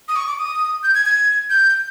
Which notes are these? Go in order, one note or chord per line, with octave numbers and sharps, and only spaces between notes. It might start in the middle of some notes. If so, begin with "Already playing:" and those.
D#6
C#6
D6
D#6
G6
G#6
G#6
G6